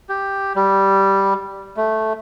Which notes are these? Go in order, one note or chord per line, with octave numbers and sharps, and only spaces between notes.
G4
G3
A3